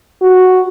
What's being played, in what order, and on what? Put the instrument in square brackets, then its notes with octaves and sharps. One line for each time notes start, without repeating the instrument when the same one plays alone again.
[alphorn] F#4